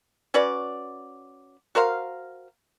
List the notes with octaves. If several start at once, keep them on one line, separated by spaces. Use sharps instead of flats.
C#4 F#4 B4 D5
F#4 A#4 C5 F5